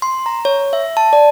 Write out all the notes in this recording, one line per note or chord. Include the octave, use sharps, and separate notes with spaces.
C6
A#5
C#5
E5
A5
D5